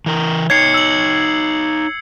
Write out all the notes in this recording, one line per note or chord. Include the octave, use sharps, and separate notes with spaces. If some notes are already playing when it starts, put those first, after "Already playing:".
E3 A#4
D#4 C#5 G#6 C7 C#7
E6 F#7